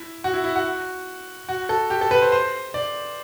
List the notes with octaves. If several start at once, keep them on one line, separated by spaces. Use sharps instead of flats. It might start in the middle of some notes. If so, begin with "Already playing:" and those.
Already playing: E4
F#4
E4
E4
F#4
F#4
A4
G4
A4
B4
C5
C5
D5